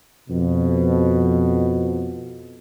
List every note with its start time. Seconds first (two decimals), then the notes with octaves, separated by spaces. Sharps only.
0.29 F2 B2